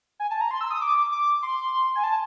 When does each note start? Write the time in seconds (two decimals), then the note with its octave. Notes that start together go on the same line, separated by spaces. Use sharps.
0.20 G#5
0.31 A5
0.41 A#5
0.51 C6
0.61 E6
0.70 D#6
0.81 D6
1.12 D6
1.43 C6
1.95 G#5
2.04 A5